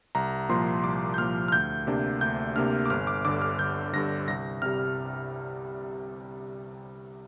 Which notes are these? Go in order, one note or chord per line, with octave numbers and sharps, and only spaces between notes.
C2 A#5
A#2 F3 C6
C2 D6
G6
A#2 F3 F6
F6
D2 G6
C3 A#3 D4
D2 G6
C3 A#3 D4 F6
D6
G1 F6
D6
G2 D3 D6
F6
G1 G6
G2 D3 A#6
C2 A#6
C3 G3 F6